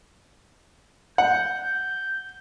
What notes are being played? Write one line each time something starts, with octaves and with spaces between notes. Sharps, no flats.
F#5 G6